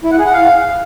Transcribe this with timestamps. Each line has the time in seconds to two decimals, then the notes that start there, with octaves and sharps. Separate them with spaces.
0.04 E4
0.11 F#5
0.18 G#4
0.26 F#5
0.33 F5